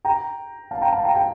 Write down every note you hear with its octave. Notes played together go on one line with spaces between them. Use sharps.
G5 A#5
F5 A5
G5 A#5
F5 A5
G5 A#5
G5